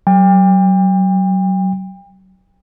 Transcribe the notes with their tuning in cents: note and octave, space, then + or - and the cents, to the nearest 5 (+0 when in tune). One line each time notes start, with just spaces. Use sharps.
F#3 +30 G5 +35